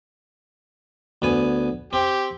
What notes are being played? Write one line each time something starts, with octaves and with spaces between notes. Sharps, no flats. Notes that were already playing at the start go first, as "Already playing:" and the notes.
D2 B3 G#5
C4 G4